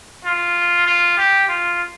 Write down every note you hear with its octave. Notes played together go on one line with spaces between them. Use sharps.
F4
F4
G4
F4